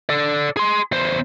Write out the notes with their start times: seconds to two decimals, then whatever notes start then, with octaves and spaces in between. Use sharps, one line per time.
0.09 A4 D5
0.57 G#4 C6
0.92 E2 C5